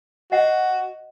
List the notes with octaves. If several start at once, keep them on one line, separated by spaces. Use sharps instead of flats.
F#4 D#5 F#5